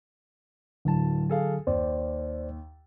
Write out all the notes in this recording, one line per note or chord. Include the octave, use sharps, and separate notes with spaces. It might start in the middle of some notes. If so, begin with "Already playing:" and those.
D1 D3 F#3 A5
G#4 A4 F5
D#2 C5 D5